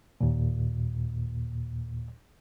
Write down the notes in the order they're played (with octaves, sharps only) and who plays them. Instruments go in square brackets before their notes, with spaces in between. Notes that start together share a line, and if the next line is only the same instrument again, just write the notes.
[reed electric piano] D#2 A#2